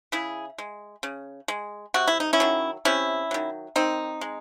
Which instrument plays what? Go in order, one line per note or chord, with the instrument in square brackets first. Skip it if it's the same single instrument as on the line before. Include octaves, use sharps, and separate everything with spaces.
[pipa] C#3 E4 G#4
G#3
C#3
G#3
C3 F#4
E4
D#4
C#4 E4
D#3 F#3
C3 C#4 E4
D#3 F#3
D#3 C4 D#4
G#3